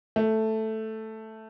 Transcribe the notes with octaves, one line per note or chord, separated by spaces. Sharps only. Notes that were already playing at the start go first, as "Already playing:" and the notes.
A3